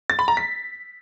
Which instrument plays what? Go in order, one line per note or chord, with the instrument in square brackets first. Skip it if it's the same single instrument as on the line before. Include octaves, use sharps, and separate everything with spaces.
[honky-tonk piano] A6
B5
A#5
B6